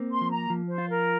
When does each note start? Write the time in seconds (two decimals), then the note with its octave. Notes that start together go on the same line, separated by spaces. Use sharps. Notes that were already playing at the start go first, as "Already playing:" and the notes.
Already playing: A#3 C4
0.12 C6
0.21 F3
0.30 A#5
0.50 F3
0.69 C5
0.78 F4
0.89 A#4